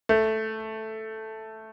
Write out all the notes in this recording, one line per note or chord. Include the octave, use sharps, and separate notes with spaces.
A3